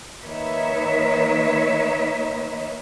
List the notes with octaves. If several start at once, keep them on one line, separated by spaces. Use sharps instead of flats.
D#3 A#3 D#4 B4 C#5 E5